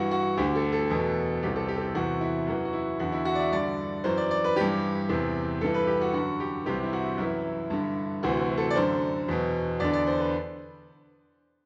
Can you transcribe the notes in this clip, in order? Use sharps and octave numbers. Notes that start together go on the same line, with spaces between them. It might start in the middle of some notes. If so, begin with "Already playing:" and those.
Already playing: G2 E3 F#4
F#4
D2 D3 G4
A4
A4
E2 B2
C2 C3 E3 G4
A4
G4
A4
G4
E2 C3 E3 F#4
E4
F#2 E3 F#4
F#4
E4
E2 D3 F#4
E4
F#4
D5
E5
G2 D3 D5
F#2 E3 C5
D5
D5
B4
G2 E3 G4
E2 C3 E3
G2 E3 A4
B4
G4
F#4
F#2 D3 F#4
G4
C2 C3 E3 G4
E4
F#4
F#2 E3 E4
G2 D3
D2 C3 E3 F#4
A4
D5
F#2 D3 C5
E2 B2
E2 D3 D5
D5
C5
B4